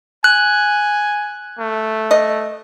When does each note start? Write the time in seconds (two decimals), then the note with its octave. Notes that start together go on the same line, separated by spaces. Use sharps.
0.24 G#5 F#6
1.59 A3
2.11 D#5